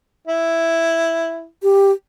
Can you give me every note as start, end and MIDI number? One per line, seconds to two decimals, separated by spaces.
0.28 1.45 64
1.63 1.91 67